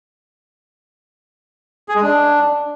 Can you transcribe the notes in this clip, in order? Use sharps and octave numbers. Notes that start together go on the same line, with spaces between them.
G#4
G#3
D4